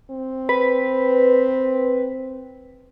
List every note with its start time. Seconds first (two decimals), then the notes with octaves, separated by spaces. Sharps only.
0.10 C4
0.49 B4